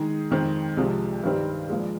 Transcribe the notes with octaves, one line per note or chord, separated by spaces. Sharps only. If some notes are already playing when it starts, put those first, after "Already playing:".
Already playing: D#3 G#3 D#4 G#4
F2 D#3 G#3 C4
C2 C3 F3 G#3
G2 D#3 G3 C4
A#2 F3 G#3